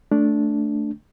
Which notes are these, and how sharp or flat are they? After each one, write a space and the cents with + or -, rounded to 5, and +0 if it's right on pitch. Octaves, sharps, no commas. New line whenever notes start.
A3 +0 D4 -10